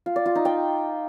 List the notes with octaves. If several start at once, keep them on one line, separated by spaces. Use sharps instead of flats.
F4
D5
F4
D#4
G5